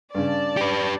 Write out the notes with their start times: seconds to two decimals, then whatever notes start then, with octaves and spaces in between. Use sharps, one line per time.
0.15 G2 C#3 D5 A5
0.57 G4 B4